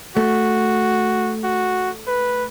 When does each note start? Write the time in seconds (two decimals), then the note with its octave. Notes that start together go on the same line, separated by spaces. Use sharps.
0.17 A3 F#4
1.44 F#4
2.08 B4